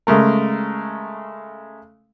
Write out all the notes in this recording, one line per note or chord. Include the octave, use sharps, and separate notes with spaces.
C#3 G#3 A3 A#4